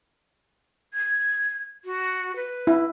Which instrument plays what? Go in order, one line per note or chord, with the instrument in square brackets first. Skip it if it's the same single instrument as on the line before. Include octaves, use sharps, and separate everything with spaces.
[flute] G#6
F#4
B4
[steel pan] E4